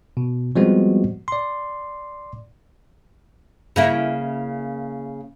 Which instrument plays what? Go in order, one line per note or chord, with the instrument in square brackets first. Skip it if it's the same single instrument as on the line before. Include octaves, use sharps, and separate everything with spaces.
[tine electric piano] B2
F3 G3 G#3 B3 C4 F#4
D5 C6
[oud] C#3 A#3 E4